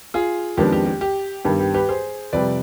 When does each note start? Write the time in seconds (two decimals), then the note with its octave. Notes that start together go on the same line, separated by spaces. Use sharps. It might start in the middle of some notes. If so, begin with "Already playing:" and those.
0.14 F4 G#4
0.57 F2 D#3 G#3 B3 D4 G4
0.72 G4
0.86 G4
1.01 G4
1.45 G2 D#3 G3 B3 G4
1.60 G4
1.74 G4 B4
1.89 G#4 C5
2.33 F2 C3 G3 B4 D5